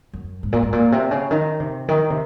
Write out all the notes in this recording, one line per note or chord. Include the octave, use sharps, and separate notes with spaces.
F#2
G#2
A#2
G#2
A#2
C3
C#3
D#3
C3
D#3
C3